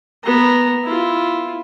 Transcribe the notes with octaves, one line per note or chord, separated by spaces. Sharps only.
B3 A#5
E4 F4